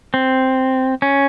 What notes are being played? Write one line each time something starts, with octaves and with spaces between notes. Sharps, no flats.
C4
C#4